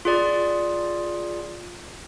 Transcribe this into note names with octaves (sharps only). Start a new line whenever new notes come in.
F4 G#4 D5